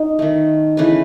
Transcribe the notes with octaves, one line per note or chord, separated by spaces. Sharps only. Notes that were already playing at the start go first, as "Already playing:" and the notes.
Already playing: D#4
D#3 A3
C#3 E3 A3 B4